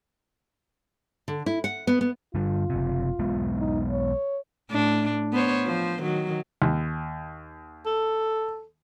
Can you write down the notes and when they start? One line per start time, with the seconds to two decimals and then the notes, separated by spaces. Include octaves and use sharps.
1.28 D3
1.46 E4
1.64 F#5
1.87 B3
2.01 B3
2.35 G2 D3 G3 F4
2.70 F#1 C3
3.19 B1 G#3 B3
3.58 D#4
3.90 C#5
4.70 A2 D4
5.33 B3 C5 C#5
5.65 F3 C5
6.03 D#3 F#3
6.62 D#2
7.86 A4